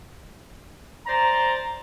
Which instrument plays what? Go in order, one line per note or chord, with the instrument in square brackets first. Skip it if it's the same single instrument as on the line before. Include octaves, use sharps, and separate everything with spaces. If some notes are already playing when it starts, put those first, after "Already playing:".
[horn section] C5 D5 A#5